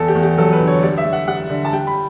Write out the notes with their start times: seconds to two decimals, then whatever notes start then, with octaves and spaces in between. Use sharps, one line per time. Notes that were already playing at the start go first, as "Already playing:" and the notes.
Already playing: E2 A4
0.08 G4
0.15 E2
0.23 G4
0.38 F#3 A4
0.53 B4
0.61 D3
0.67 C#5
0.83 G3 D5
0.98 E5
1.05 G3
1.13 F#5
1.27 G3 F#5
1.49 D3
1.65 A5
1.73 G3 G5
1.87 B5